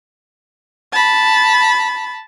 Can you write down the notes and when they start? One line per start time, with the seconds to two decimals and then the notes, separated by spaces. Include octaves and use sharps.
0.92 A5 B5